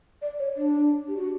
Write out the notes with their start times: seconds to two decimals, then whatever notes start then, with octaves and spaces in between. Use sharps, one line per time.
0.22 D5
0.39 C#5
0.57 D4
1.08 G4
1.17 F#4